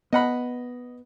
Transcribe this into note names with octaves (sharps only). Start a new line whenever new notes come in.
B3 D#5 F#5 B5